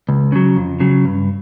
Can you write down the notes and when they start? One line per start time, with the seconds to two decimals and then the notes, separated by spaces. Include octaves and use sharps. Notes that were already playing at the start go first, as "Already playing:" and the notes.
0.09 C#2
0.32 C#3 F#3
0.56 F2
0.80 C#3 F#3
1.05 G2